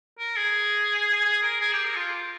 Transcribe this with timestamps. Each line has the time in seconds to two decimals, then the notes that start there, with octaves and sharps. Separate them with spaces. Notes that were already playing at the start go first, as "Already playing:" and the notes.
0.19 A#4
0.37 G#4
1.25 G#4
1.43 A#4
1.61 G#4
1.73 G4
1.85 A#4
1.96 F4